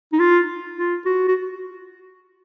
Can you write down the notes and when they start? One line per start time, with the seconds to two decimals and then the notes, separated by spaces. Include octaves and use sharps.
0.13 D#4
0.19 F4
0.76 F4
1.06 F#4
1.28 F#4